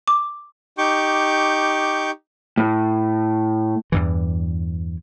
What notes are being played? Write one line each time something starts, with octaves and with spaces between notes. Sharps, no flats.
D6
D#4 G4 C#6 D6 G6
A2
E2 G2 E3